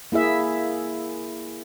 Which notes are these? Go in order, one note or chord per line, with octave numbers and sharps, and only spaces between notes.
A#3 E4 G#4 E5